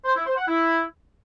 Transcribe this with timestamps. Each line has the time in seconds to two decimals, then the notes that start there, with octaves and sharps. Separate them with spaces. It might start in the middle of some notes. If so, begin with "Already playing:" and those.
0.05 C5
0.16 E4
0.26 C5
0.37 F#5
0.47 E4